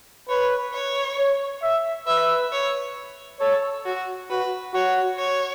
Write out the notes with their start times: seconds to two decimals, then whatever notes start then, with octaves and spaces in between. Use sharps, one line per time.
0.29 B4 C#5
0.73 C#5
1.18 C#5
1.63 E5
2.07 B4 E5
2.52 C#5
3.40 A4 C#5
3.86 F#4
4.30 F#4 B4
4.74 F#4 C#5
5.18 C#5